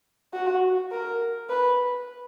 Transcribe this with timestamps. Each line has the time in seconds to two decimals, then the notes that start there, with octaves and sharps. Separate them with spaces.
0.33 F#4
0.91 A#4
1.49 B4